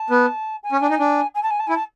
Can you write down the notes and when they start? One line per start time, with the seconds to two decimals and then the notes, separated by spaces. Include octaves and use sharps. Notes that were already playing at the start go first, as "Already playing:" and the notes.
Already playing: A5
0.10 B3
0.63 G#5
0.72 C#4
0.82 D4
0.90 D#4
0.99 D4
1.35 G#5
1.43 A5
1.51 G#5
1.60 A5
1.67 E4 G#5
1.75 A5